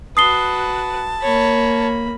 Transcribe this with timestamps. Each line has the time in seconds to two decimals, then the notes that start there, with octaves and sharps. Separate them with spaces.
0.17 F#4 B4 A5 D#6 C7 G7
1.23 A#3 C#5 B5